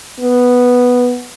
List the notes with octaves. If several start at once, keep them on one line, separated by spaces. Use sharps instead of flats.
B3